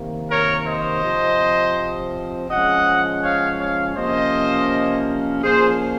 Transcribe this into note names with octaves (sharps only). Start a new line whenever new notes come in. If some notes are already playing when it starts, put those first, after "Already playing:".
Already playing: C3 D#3 A#3
A#4 C#5
C5 D#5
C3 F3 C4
F3 G#3 C#4 D#5 F#5
C#5 F5
C#5 F5
C3 F3 A#3 C#4 C5 D#5
A#2 F3 A#3 C#4 G#4 C5